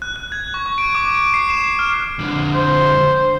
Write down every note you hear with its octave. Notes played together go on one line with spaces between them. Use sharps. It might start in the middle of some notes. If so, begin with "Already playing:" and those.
F#6
F#6
G#6
C#6
C#6
D7
D6
D7
C7
E7
F6
F2 D3
C5